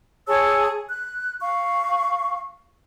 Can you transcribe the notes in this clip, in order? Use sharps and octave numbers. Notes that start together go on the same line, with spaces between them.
G#4 C#5 A5 E6
F#6
F5 C#6